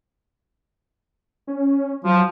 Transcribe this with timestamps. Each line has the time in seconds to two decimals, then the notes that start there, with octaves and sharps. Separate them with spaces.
1.47 C#4
2.04 F3 F#3